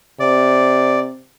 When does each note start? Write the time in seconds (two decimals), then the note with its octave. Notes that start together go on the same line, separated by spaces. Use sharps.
0.20 C3 D5